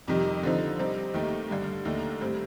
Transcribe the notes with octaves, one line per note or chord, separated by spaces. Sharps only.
F2 C3 D#3 G3
D3 F3 C4 D#4
C3 G3 C4 D#4
D#2 D#3 A3 D#4 G4
G2 D3 G3
D#2 D3 A3 D#4
A2 G3 C4